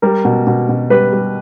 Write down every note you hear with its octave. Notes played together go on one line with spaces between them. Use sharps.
G3 A#4
B2
B2
B2
G3 B4
G3